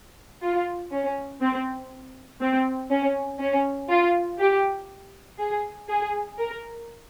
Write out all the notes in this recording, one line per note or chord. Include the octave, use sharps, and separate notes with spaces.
F4
C#4
C4
C4
C#4
C#4
F4
G4
G#4
G#4
A#4